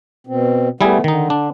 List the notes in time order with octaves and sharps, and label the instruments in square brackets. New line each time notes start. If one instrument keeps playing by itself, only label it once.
[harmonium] B2 C4
[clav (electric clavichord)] G3 E4 G#4 [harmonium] A3 B3
[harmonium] D3 [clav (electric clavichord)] D#3 D#4
[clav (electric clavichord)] D4